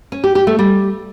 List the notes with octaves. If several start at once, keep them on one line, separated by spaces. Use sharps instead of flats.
C#4
G4
G4
A3
G3